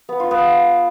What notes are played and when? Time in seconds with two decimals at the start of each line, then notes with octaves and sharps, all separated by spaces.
0.09 B3
0.20 F4
0.31 B3